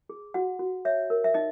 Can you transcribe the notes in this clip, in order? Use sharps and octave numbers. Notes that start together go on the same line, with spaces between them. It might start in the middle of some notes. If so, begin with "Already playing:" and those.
G#4
F#4 F#5
F#4
C#5 E5
A#4
E5
D#4 D#5